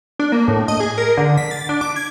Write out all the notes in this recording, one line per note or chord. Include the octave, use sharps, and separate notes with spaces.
D4
A#3
A2
D#5
G#4
A#4
D3
B6
A6
D4
D6
G#6